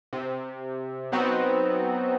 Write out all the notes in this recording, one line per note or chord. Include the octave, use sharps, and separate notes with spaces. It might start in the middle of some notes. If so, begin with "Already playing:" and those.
C3
F#3 B3 C4 D#4 F#4